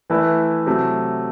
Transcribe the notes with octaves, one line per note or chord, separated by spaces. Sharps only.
E3 A3 E4 B4
C3 F#3 A3